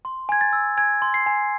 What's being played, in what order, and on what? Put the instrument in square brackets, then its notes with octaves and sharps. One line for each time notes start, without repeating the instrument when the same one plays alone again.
[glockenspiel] C6
G#5 G#6
A6
E6
G#5 G#6
C6
C7
G#5